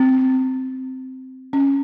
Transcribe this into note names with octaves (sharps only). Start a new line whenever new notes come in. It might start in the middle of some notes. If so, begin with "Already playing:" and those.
Already playing: C4
C#4